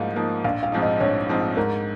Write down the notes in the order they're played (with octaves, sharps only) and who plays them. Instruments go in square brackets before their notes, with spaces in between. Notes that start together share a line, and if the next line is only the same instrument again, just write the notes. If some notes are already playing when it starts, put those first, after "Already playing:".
Already playing: [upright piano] G#2 F3 A#3 D#4 [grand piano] F5
[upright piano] F3 A#3 D#4
[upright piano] A#1 [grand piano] F5
[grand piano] F5
[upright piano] G#2 F3 C4 D#4
[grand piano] D#5
[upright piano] A#1 [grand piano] C#5
[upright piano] G#2 F3 C4 D#4
[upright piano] G#2 [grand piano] A#4